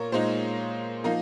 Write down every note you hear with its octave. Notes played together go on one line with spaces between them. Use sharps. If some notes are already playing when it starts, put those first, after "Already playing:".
Already playing: A#2 A#4 C#5
A#2 G#3 D#4 C5
F3 A#3 D#4 A#4